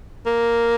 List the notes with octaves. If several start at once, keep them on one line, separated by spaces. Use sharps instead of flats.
A#3